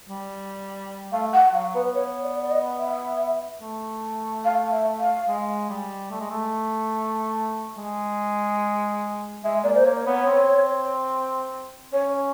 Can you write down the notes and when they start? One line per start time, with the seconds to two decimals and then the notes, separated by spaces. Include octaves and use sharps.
0.09 G3
1.12 A3 F5
1.34 F#5
1.54 F#3 F5
1.75 B3 B4
1.95 C#5
2.23 D5
2.41 D5
2.51 D#5
2.79 E5
3.61 A3
4.45 F5
4.72 E5
5.00 F5
5.28 G#3
5.70 G3
6.10 A3
6.20 G#3
6.30 A3
7.77 G#3
9.44 G#3 E5
9.64 A#3 D5
9.75 C5
9.85 A#3 C#5
10.06 B3 C#5
10.27 C4
11.93 C#4 C#5